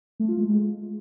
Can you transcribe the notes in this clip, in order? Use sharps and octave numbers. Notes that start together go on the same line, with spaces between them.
A3
F4
G#3